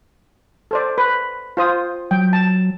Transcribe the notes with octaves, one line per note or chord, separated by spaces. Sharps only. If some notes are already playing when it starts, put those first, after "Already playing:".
A4 C5 D5
B4
F4 C5 D#6
F#3 G5
A5